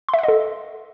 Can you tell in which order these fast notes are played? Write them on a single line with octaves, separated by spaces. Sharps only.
C6 E5 F#5 D#5 A4